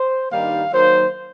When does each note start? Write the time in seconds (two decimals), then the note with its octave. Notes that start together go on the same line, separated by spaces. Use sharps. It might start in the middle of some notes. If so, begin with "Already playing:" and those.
Already playing: C5
0.30 G2 D#3 G3 A#3 D#4 F5
0.72 D#3 F#3 A#3 D#4 C5